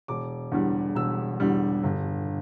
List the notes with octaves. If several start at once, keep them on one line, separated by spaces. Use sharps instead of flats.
E1 D6
E2 D3 G3
E1 E6
E2 D3 G3
G1